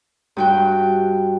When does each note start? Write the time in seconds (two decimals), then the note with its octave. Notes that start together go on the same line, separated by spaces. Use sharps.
0.37 G2 F#4 G5